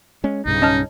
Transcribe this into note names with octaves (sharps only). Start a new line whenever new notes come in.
G#3 C#4
B1 G2 C#3 D#4
C#4 D#5 A5 F6